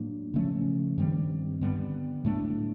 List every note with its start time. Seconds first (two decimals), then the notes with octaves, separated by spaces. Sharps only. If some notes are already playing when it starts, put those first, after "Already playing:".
Already playing: A2 F#3 A#3 D4
0.34 C#3 F3 A3 C#4
0.98 G2 D#3 G3 C4
1.61 D3 G3 B3
2.25 A2 F#3 A3 D4